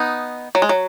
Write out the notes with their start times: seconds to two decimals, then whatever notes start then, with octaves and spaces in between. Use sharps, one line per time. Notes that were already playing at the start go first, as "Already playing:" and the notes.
Already playing: B3 D#4
0.55 F#3
0.62 G#3
0.69 F#3